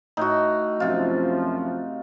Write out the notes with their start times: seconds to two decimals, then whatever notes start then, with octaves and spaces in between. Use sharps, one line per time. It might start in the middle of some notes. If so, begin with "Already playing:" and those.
0.17 A2 D#4 F#4
0.80 F#2 C3 F3 F4